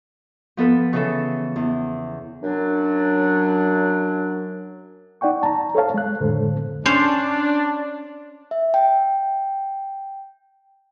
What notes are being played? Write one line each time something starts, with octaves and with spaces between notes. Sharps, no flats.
F3 B3 A4 B4
C#3 E3 A4
E2
F#2 F#3 D4
D#4 D5 F#5 G5 C#6
A5 A#5
A4 C5 C#5 F5 A5
G#3 F#6
F2 A2 D3 G#3 A4 C5
C#4 D4 C5
E5
G5